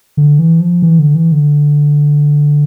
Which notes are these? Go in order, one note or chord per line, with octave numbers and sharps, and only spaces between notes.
D3
E3
F3
E3
D3
E3
D3